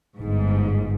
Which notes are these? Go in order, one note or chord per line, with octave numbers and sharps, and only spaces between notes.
G1 G#2